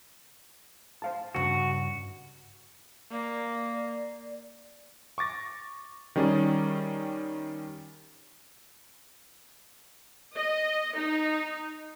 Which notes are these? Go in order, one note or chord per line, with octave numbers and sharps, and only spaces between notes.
C5 F5 A5
C2 G2 C#3 F#4
A#3 D5
C#6 D6 A6 A#6
D#3 G3 C#4 G#4 D5
D#5
D#4